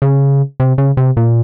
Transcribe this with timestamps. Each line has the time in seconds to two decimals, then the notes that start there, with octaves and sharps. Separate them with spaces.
0.02 C#3
0.60 C3
0.78 C#3
0.97 C3
1.17 A#2